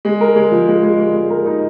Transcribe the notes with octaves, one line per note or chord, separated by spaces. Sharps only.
G#3
A#4
G#3
F3
G#3
G#3
G#3
G#3
A#4
D#4